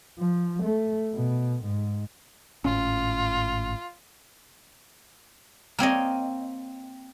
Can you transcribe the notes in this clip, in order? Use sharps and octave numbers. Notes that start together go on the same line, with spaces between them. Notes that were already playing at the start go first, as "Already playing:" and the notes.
F3
A3
B2
G#2
G#1 A2 C#4 F4
A#3 C4 C#5 D#5